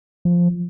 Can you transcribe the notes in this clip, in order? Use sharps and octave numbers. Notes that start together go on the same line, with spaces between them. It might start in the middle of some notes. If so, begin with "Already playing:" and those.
F3